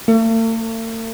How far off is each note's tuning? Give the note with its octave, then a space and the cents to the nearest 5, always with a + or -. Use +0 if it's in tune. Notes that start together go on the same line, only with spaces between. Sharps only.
A3 +45